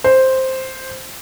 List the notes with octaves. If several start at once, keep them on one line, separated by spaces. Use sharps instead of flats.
C5